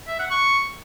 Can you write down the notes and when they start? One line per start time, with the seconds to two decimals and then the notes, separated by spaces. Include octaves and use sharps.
0.08 E5
0.19 F#5
0.30 C#6